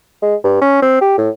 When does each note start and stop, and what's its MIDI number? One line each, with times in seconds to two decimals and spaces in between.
0.22 0.35 56
0.44 0.60 43
0.61 0.77 61
0.82 1.00 60
1.01 1.15 67
1.18 1.30 45